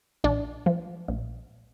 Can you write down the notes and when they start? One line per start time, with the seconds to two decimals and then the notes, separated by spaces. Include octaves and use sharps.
0.24 A#1 D4
0.66 F3
1.08 A#1